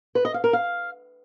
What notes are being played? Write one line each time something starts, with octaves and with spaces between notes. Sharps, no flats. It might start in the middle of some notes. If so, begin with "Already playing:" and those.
B4
D#5
F5
A#4
F5